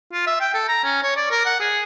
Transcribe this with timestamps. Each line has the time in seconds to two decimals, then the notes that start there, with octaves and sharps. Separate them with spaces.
0.13 F4
0.27 E5
0.41 G5
0.54 A4
0.68 A#5
0.84 C#4
1.03 C#5
1.16 D5
1.31 A#4
1.45 F#5
1.60 G#4